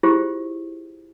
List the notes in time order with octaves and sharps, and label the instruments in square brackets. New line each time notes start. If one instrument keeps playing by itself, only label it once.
[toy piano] E4 F4 G4 G#4 C5